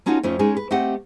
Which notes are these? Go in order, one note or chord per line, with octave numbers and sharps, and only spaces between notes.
A#3 C#4 D#4 F4 F#4 A4
F2 A3 C#4 F4
G#3 C#4 D#4 G#4
B4
A3 C4 G4 D#5 F#5